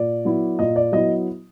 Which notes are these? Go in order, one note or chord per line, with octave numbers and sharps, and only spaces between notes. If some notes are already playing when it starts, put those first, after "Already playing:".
Already playing: A#2 D5
F#3 B3 E4
A#2 D#5
D5
F#3 B3 E4 D#5